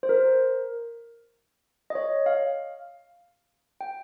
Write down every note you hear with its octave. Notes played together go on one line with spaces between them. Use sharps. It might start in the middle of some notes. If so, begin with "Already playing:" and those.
C5
A#4
D#5
C#5
F5
G5